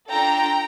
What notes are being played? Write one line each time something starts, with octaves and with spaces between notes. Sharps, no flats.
D4 F4 A4 G5 A#5